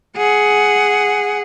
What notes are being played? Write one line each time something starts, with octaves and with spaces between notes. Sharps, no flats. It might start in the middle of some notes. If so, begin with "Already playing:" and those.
G#4 F#5